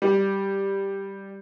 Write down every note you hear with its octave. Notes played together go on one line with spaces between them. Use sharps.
G3